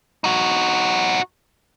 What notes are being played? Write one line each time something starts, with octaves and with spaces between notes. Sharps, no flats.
D#4 F#4